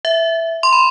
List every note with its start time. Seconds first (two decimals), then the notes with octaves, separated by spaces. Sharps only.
0.05 E5
0.63 C6
0.73 B5